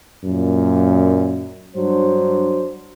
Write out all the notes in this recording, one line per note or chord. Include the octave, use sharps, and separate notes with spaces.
F#2 A#2
G2 F#3 D4 C5